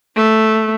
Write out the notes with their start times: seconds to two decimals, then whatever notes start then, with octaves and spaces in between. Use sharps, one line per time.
0.16 A3